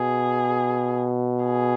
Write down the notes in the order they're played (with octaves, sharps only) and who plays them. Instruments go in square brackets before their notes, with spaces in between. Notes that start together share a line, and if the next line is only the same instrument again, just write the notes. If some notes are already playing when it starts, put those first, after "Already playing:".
Already playing: [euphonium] B2 [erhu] G#4
[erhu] G#4